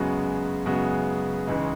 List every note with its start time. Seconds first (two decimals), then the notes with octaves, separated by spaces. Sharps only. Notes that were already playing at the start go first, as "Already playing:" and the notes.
Already playing: F#2 C#3 G#3 B3 F#4
0.66 F#2 C#3 G#3 B3 F#4
1.47 C#2 C#3 E3 G#3 D#4